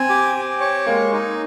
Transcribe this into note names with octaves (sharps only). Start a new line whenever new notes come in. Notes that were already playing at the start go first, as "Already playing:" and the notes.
Already playing: C4 G#5
G4
G4
C#5
G#3 A#3
D#4